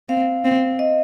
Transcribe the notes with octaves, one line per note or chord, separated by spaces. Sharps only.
C4 F5
C4
D#5